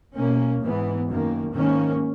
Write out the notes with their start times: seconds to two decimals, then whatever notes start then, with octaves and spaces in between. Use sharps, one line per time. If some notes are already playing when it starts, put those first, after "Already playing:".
0.15 B2 A#3 C#4
0.61 G#2 E3 B3
1.08 F#2 D#3 A#3
1.54 G#2 D#3 A#3 C#4